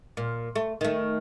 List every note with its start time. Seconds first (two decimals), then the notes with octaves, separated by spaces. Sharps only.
0.17 A#2
0.55 A3
0.81 D#3 A3